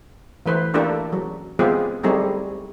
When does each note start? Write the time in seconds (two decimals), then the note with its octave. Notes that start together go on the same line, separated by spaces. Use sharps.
0.46 E3 A3 B4 C5
0.74 A3 A#3 D4 E4 G4 A4
1.12 F#3
1.59 G#3 B3 C4 F4 G4 G#4
2.03 F#3 G3 A3 C4 D#4 G#4